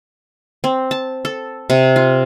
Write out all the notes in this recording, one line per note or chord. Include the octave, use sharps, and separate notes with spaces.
C4
A5
A4
C3
F4